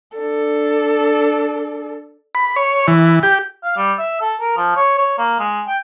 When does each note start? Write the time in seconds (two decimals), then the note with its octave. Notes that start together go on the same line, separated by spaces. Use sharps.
0.18 D4 A4
2.35 B5
2.56 C#5
2.88 E3
3.23 G4
3.64 F5
3.77 G3
3.99 E5
4.21 A4
4.41 A#4
4.57 F3
4.76 C#5
4.98 C#5
5.18 A#3
5.39 G#3
5.67 G5